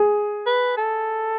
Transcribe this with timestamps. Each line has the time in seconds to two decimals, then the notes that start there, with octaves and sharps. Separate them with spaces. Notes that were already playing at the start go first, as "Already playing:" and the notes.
Already playing: G#4
0.46 B4
0.77 A4